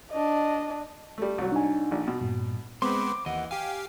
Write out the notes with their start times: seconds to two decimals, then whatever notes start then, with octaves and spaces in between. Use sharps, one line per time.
0.11 D4 D#5
1.18 G3 A3
1.38 C2 F#3
1.52 D4 D#4 G#5
1.91 A#1
2.08 B2
2.21 G2 A#2
2.82 G#3 B3 C4 B5 C6 D6
3.26 D#2 E3 D#5 F#5
3.51 G4 F5 G5 G#5